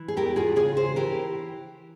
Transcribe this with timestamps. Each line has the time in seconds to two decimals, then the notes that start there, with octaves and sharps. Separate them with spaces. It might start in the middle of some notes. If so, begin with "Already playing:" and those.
Already playing: E3
0.08 G#4
0.16 E2 G4 A#4
0.36 F4 G#4
0.56 C#3 F4 G#4
0.77 G#4 C5
0.96 E3 G4 A#4